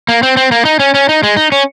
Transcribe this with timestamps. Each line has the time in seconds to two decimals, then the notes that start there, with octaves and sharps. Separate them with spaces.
0.09 A#3
0.23 C4
0.37 C4
0.52 A#3
0.65 D#4
0.79 C#4
0.94 C#4
1.09 D#4
1.23 G#3
1.36 D#4
1.52 C#4